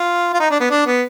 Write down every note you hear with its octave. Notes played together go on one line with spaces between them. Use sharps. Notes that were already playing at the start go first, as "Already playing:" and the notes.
Already playing: F4
F4
D#4
D4
B3
D4
B3